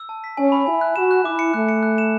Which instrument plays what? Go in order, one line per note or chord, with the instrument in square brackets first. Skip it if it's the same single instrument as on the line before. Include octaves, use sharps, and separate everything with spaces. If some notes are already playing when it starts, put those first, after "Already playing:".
Already playing: [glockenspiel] E6
A5
B6
[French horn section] C#4 [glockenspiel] G#5
[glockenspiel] B5
[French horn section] E4 [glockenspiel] G#5
[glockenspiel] F#6
[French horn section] F#4 [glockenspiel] E7
[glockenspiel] F#6
[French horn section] E4 [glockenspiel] D6
[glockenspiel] C#7
[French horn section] A3 [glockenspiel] F#6
[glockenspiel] C#7
F#6
E7